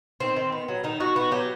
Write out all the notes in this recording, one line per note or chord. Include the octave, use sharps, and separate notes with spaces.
D#3 C4
D#3
B3
F#3
D#3 D#4
D#3 F#4
B3 F#4
F#3 G4